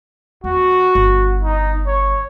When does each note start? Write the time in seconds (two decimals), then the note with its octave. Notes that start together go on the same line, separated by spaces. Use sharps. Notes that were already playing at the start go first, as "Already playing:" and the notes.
0.44 E2 F#4
0.95 G1
1.43 D#4
1.87 C#5